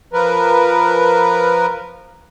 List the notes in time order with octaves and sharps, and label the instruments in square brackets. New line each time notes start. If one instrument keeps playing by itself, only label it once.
[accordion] F3 A#4 B4